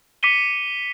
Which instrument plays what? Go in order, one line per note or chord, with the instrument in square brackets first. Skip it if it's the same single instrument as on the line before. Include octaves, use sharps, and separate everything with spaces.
[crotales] D6 B6 C#7 D#7 G7